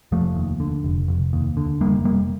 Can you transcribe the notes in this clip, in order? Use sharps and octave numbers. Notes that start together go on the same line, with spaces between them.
F1 F3 A3
D#2
D3
F1
F1
D#2
D3
F1 G3 A#3
F1 G3 A#3